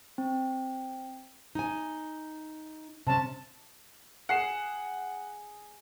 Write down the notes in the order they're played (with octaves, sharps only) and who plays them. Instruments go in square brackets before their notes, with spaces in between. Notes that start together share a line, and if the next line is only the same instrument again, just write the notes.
[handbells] C4
[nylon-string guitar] D#4 G#5
[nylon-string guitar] C3 C#4 [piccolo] A5
[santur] G#4 [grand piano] F#5 C7 E7